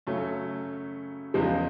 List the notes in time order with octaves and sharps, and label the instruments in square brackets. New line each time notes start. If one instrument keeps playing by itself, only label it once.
[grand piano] F#2 C#3 F#3 A3 C#4
E2 C#3 F3 G#3